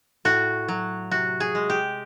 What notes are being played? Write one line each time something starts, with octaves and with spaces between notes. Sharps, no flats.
A2 F#4
F#3
C3 F#4
G#4
G#3
G4